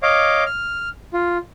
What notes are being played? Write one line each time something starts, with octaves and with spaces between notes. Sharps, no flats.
C#5 D#5 F5 D6
F6
F4